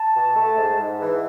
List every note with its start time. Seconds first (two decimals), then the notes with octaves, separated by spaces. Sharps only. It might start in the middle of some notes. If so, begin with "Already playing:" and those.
Already playing: A5
0.13 B2
0.34 A3
0.56 G#2
0.78 G#2
1.00 E3